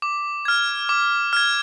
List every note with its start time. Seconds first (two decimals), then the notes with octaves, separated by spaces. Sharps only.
0.02 D6
0.45 F6 G#6
0.89 D6
1.33 F6 G#6